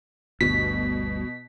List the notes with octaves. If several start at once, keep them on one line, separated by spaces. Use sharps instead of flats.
G1 D2 G2 B2 B6